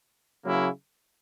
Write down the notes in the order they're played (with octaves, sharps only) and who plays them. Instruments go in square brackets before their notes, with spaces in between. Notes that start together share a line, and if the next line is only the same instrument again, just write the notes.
[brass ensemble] C#3 F#3 A#3 E4